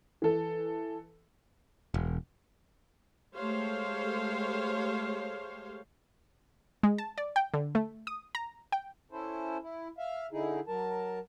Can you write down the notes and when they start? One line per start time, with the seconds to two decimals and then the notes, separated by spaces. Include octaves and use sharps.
0.22 E3 A4
1.94 E1
3.36 G#3 A3 G4 C5 C#5 F5
6.83 G#3
6.98 A5
7.18 D5
7.36 G5
7.54 D3
7.75 A3
8.07 D#6
8.35 A#5
8.72 G5
9.11 C#4 E4 A4 C5
9.63 E4
9.98 E5 F5
10.32 D3 D#4 E4 G#4
10.68 F#3 A#4 A5